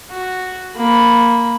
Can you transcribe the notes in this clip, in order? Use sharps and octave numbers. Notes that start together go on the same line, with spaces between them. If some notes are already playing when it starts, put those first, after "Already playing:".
F#4
A#3 B5